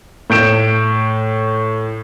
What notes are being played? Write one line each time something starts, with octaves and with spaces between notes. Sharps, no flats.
A2 G6 D7 E7